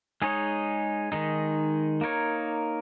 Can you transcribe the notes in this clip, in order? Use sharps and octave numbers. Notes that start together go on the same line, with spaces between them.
G#3 D#4 G#4 C#5
D#3 G#3 D#4
A#3 D#4 A#4 C#5